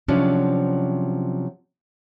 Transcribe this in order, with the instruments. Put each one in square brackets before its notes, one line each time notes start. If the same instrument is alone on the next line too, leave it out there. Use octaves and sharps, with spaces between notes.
[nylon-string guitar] C3 F3 F#3 G#3 C#4 D4